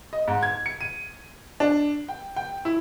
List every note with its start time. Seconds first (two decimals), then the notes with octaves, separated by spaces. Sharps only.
0.13 D#5
0.28 G#2
0.43 G#6
0.66 C#7
0.81 D#7
1.60 D4
2.08 G5
2.36 G5
2.65 E4